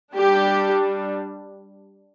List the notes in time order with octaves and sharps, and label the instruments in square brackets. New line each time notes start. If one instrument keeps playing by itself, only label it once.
[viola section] G3 D4 G4